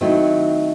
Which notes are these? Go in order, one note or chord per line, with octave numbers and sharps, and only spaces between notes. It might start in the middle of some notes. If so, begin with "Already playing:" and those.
D#3 F#3 A3 C4 E4